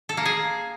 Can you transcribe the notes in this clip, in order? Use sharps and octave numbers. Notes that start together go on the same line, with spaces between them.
A4
A#3
G#4